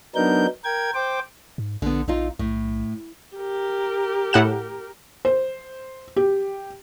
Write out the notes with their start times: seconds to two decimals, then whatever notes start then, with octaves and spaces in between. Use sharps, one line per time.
0.15 F#3 B3 D4 D#4 A#4 G6
0.64 A#4 G5 G#6
0.94 C5 G5 D6
1.58 G#2
1.82 A#1 D3 B3
2.08 A#1 C4 D#4 F4
2.39 B1 A2
3.37 G4 A#4
4.33 A2 F#5 E7
5.25 C5
6.16 G4